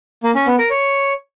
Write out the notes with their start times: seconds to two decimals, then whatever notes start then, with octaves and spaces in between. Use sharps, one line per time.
0.23 A#3
0.35 C#4
0.47 B3
0.59 A#4
0.70 C#5